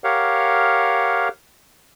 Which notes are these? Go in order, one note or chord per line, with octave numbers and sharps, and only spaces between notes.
G4 A#4 C#5 F5 F#5